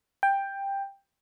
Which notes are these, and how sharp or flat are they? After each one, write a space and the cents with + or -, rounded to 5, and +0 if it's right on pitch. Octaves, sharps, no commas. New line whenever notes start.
G5 +10